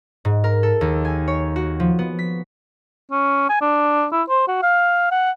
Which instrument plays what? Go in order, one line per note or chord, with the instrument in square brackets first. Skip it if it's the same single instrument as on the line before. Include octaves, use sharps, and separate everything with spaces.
[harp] G#2
A#4
A4
D#2
G#5
C#5
F#4
F3
B3
B6
[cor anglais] C#4
G#5
D4
E4
C5
F#4
F5
F#5